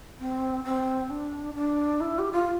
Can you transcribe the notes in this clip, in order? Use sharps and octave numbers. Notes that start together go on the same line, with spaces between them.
C4
C4
D4
D4
E4
G4
F4